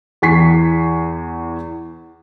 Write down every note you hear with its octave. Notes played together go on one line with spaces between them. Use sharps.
E2 E3 G#5 C#6 B6 C7